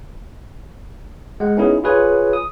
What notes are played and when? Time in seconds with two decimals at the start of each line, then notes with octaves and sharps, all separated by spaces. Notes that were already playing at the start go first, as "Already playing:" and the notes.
1.40 G#3 F#5
1.57 B3 C#4 D#4 E4 G#4
1.84 F4 G#4 B4 C#5 G#5
2.33 D#6